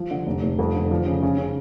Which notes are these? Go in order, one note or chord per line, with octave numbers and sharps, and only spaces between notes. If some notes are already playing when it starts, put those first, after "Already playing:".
Already playing: F3
D3
F1
F1
F2
D3
F3
C#3
C#3
C#3